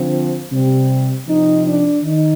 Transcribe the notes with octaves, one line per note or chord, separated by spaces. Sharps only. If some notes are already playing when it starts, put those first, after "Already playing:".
Already playing: D3 F3 C4
C3 G3 C4
C3 F3 C4 D#4
D4
D#3 D#4